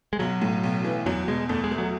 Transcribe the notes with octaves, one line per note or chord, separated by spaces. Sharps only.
G#3
B1 F#3
A2
B1
E3
E2 F#3
B2 G#3
E2 A3
G#3
A3
F#3